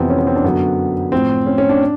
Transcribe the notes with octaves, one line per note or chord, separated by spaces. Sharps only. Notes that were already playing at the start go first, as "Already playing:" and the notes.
Already playing: F2 C3 E3 B3 C4
C#4
B3
C4
D4
F#2 D3 F#3 B3
A2 F3 C4
C#4
C#4
D4